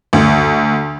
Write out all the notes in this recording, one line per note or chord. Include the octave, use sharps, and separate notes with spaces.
D2